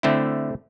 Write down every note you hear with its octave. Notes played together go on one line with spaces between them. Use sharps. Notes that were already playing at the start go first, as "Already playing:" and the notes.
D3 A3 C4 E4